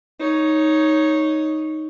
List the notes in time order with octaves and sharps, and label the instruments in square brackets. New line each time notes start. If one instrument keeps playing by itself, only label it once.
[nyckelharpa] D#4 C#5